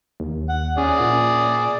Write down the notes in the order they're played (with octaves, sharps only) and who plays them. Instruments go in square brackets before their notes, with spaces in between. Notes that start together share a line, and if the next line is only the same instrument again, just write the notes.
[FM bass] D#2
[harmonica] F#5
[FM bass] C#4 [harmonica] G#4 D5
[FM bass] A#2